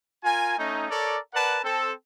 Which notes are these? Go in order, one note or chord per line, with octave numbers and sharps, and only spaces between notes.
F4 A#4 G#5
A3 C#4 D#4
A4 A#4 C#5 D5
A#4 B4 D5 F#5 A5
C4 A4